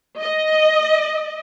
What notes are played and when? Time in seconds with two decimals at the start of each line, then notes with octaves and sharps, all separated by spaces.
0.22 D#5